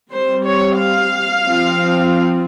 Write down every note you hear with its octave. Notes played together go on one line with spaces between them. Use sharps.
G3 C4 C5
C#5
F5
F3 C4